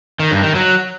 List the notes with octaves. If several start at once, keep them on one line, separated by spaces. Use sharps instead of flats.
D#3
G2
D#3
F#3